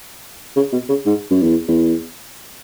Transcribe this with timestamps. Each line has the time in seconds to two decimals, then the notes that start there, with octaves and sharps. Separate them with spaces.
0.56 C#3
0.73 B2
0.89 C#3
1.06 G#2
1.31 F#2
1.43 E2
1.68 E2